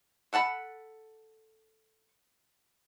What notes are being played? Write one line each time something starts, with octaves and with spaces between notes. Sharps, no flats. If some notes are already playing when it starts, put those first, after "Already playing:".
A4 F#5 A5 B5